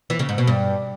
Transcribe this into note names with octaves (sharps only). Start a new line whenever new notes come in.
E3
C#3
G#2
B2
G2